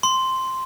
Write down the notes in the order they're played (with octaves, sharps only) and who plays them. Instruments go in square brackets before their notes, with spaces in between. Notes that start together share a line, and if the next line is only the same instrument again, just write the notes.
[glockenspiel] C6